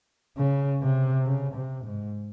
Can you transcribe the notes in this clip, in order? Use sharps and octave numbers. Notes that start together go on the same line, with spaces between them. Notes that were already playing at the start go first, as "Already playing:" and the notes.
C#3
C3
C#3
C3
G#2